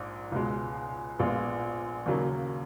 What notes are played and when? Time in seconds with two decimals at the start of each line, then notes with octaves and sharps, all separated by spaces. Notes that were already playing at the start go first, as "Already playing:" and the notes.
Already playing: A#1 G#2
0.32 C#2 B2 G#3
1.19 A#1 A#2 G#3 B3 F4
2.06 D#2 C#3 F#3 A#3